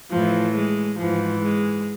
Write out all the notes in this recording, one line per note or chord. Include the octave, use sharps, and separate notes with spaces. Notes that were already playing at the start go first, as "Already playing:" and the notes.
A2 E3 F3
G#3
G#2 E3 F3
G#3